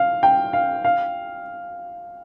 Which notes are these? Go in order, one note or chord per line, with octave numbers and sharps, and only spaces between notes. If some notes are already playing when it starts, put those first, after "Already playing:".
Already playing: F5
G5
F5
F5